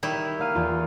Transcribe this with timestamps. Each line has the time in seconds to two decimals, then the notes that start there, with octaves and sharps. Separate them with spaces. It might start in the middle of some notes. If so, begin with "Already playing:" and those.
0.03 D#3 G3 E4
0.39 A#3 F5 D#7
0.55 E2 F4